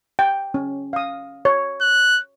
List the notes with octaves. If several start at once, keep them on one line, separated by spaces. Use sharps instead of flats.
G5
C#4
F5 D#6
C#5
F#6